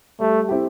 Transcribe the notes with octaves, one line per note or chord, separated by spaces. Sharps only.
G3 A3
C4 E4 G4